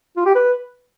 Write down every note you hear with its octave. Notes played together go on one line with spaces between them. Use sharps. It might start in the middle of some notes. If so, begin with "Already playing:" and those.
F4
G4
B4